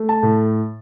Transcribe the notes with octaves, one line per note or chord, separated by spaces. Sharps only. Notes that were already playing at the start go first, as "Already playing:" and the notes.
Already playing: A3
A5
A2